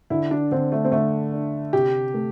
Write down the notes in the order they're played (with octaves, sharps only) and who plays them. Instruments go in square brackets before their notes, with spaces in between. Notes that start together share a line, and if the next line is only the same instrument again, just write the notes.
[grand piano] D3 [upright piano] E4
[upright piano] D4
[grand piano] D3 [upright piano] C4
[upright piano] A3
C4
[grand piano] D3 [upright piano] A3
[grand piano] D4
[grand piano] C3 [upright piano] G4
[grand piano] A3